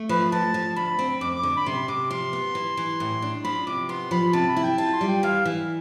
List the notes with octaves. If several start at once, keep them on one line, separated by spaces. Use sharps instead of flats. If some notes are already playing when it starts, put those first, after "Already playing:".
Already playing: A3
F3 B4
F3 A5
F3
D2 B5
C4
F2 D6
D6
D3
B5
C3 C6
C3 D6
F3 C6
B3
E3
E3
A2
D4
F3 B5
C3 D6
B3 C6
F3 B5
C3 A5
B5
E4
G5
F4 A5
C6
G3
G5
E3 F5
E3